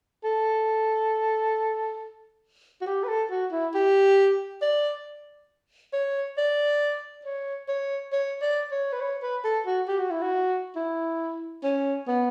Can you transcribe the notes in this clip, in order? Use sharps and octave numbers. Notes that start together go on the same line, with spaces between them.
A4
F#4
G4
B4
A4
F#4
E4
G4
D5
C#5
D5
C#5
C#5
C#5
D5
C#5
B4
C#5
B4
A4
F#4
G4
F#4
E4
F#4
E4
C#4
B3